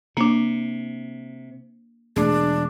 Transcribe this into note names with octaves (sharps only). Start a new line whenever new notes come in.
C3 A#3 D4
E1 A3 D4 G#4